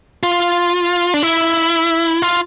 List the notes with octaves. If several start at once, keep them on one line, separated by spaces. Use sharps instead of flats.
F4
D4
E4
F4